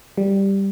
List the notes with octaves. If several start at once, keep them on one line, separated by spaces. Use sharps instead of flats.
G3